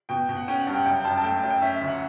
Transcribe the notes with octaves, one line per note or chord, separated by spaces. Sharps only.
B2 G5
B2
F#5
C#4 G5
F#5
G2
G5
F#2 G5
G5
F#2 A5
A5
A3 G5
G5
F#2
G5
C#4 E5
E5
D2
F#5